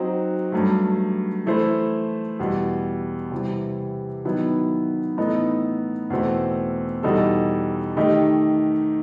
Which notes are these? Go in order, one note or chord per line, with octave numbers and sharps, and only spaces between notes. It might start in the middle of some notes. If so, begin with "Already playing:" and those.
Already playing: F#3 C4 D#4 F#4
G2 F#3 A3
E3 A3 E4 A4 C5
E2 B2 G3
C3 E3 G3
D#3 F#3 B3 E4
A2 E3 B3 D#4 A4
E2 B2 A3 C4
E2 B2 G3 D#4 A4
D#3 A3 D#4 G4